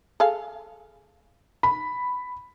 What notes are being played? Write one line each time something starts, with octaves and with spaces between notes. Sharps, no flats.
G#4 A4 F5
B5